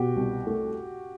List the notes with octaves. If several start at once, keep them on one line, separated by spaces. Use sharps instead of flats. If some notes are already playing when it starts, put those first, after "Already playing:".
Already playing: B2 F#4 G4
C2
A3